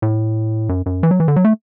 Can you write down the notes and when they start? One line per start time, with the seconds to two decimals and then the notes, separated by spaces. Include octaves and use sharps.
0.02 A2
0.69 F#2
0.86 F#2
1.03 E3
1.11 F#3
1.20 E3
1.28 D3
1.36 F#3
1.45 A3